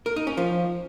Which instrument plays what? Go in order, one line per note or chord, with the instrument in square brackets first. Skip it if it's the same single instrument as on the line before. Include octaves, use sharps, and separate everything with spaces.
[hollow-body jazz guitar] A#4
D#4
C#4
F3